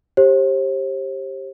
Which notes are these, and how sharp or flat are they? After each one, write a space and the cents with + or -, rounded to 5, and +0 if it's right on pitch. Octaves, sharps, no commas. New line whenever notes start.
G4 +0 C5 +40